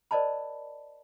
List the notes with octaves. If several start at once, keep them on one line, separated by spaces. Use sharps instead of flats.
A#4 C5 D5 D#5 A5 B5